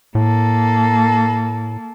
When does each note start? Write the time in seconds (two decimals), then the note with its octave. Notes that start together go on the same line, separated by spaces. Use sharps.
0.15 A2 A#3 A4